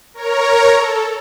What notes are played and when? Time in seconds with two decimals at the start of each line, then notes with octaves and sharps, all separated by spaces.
0.14 A#4 C#5 A#5
0.75 A4